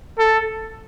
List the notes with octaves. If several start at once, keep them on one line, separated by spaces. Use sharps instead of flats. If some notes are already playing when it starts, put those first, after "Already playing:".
A4